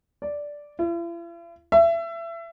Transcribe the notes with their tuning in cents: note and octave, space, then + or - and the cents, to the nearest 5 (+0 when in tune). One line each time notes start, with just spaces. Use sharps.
D5 -5
E4 +45
E5 +30